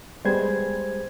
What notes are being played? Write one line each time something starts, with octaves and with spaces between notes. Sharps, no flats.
G3 G#3 B3 G#4 C5 G#6